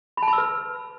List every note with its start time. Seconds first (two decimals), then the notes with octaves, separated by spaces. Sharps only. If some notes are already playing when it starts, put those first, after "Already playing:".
0.17 B5
0.23 A5
0.28 B5
0.33 E6
0.38 B4